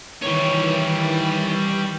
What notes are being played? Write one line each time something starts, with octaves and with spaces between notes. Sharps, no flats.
D#3 E3 G3 C#5